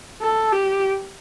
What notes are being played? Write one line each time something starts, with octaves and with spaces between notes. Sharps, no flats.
A4
G4